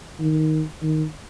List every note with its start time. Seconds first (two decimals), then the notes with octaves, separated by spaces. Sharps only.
0.20 D#3
0.83 D#3